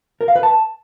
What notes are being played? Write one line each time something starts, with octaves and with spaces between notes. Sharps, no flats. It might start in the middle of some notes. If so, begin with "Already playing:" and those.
A#4
F5
B4
A5